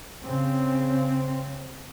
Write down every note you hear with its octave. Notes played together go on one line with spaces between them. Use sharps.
C#3 C4